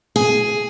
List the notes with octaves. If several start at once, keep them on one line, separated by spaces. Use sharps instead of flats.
G#4